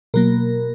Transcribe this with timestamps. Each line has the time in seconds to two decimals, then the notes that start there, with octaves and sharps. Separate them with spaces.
0.14 B2 F#3 A#3 A#4